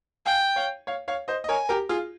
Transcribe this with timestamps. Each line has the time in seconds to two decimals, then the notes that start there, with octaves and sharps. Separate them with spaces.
0.26 F5 G5 G#5
0.56 C#5 F5
0.87 C#5 F5
1.08 C#5 F5
1.28 C5 D#5
1.44 D#5
1.49 A#4 C#5 G#5
1.69 G4 A#4
1.89 F4 G#4